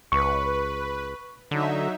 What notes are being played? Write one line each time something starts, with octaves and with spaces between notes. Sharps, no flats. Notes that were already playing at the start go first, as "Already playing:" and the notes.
C#2 B4 C#6
D3 F#3 D#4 E5